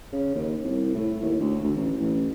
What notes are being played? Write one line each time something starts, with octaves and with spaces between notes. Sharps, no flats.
C#3
D#2
C2
A2
D#2
D2
D2
A1
A1